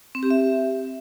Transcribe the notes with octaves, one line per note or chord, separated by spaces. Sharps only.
C4
G4
E5